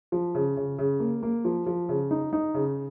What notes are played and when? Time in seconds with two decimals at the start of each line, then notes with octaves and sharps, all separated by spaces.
0.12 F3
0.35 C#3
0.57 C#3
0.79 C#3
1.00 A#3
1.23 A#3
1.45 F3
1.66 F3
1.89 C#3
2.11 D#4
2.33 D#4
2.54 C#3